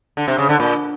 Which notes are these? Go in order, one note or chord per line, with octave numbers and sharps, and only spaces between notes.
D3
C3
C#3
D3
A#2